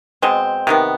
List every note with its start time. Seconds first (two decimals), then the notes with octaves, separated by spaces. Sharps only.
0.22 B2 G#3 C4
0.67 C3 D#3 B3